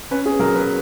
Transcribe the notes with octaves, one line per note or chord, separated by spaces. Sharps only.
C#4 B4
G#4
F#3 A#4
B4